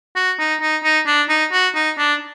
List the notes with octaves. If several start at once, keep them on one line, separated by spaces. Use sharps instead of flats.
F#4
D#4
D#4
D#4
D4
D#4
F#4
D#4
D4